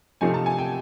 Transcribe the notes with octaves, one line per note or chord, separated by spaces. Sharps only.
C3 F3 A3 C4 D#4 G#5
A5
G#5
G5